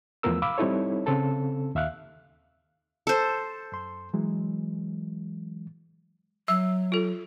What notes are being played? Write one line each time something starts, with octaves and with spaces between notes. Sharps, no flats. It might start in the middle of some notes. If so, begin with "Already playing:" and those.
E2 F3 A3 B3 A#4 E6
F5 B5 D6 E6
G3 C4 D#4 E4 A4 C#5
C#3 C4 A4 A5
D#2 E5 F5 F#6
A4 C5
F#2 C6
E3 F#3 G#3
F#3 E5 E6
F4 A4